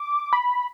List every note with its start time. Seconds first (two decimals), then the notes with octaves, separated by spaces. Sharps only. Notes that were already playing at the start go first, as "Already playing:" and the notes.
Already playing: D6
0.33 B5